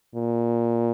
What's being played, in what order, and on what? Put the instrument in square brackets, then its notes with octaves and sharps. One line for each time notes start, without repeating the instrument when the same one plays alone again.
[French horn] A#2